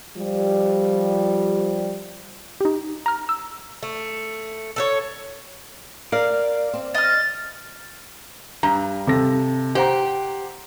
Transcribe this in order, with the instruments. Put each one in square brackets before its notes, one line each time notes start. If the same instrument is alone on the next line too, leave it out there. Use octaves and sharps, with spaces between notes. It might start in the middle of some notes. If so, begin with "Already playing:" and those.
[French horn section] F3 G3
[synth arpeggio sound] D#4 G4
A#5 F6
E6
[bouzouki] A3
A4 B4 C#5
[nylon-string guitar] A#4 [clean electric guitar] D5 [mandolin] F5
[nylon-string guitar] C4
[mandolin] D#5 F6 [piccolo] A6
[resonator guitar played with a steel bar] G2 [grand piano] A#5
[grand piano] C3 A4 A#6
[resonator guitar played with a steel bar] G4 [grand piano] C5 F#5 A#5